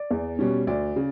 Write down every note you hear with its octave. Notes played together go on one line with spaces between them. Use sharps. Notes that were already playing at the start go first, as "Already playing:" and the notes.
Already playing: D5
E2
B2 G3 C#4
D2 D5
C#3